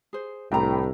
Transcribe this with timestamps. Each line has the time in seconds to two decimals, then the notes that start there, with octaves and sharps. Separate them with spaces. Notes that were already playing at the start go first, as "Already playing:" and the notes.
0.13 G#4 C5
0.52 C2 A2 D4 G5 A#5